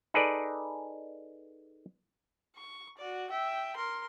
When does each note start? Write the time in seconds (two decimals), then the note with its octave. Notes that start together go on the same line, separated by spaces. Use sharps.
0.14 D#4 G#4 A4 B4 D5
2.56 C#6
2.98 F#4 D5
3.30 E5 G5
3.76 A#4 C6